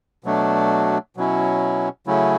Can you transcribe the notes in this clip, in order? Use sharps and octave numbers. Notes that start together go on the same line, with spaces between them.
B2 F#3 A3 D4
B2 F#3 C#4 E4
C#3 F#3 A3 C#4 E4